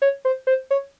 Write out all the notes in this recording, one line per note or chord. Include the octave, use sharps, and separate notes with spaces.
C#5
C5
C5
C#5